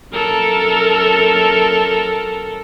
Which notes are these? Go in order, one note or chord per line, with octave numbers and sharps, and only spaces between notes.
F#2 A4 A#4